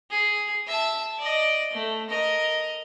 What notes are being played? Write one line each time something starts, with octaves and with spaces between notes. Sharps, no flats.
G#4
E5 A5
D5 D#5
A3
A#4 D#5